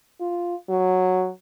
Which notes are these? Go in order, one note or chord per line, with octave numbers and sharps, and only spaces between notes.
F4
F#3